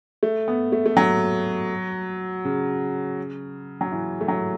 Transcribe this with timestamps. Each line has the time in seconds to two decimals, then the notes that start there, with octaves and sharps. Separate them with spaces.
0.23 A3
0.48 B3
0.72 A3
0.86 A3
0.97 F#3
2.45 C#3
3.81 F#3
3.92 E3
4.21 A3
4.28 F#3